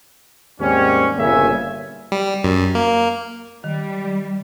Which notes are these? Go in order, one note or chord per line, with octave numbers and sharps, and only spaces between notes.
D#2 G#2 G3 C4 C#4
G1 A#2 C#3 A#3 E5 G#5
G3
F#2
A#3
D#3 G3